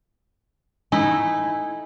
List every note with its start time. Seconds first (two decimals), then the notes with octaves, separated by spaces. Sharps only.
0.92 A3 D#4 E4 G#5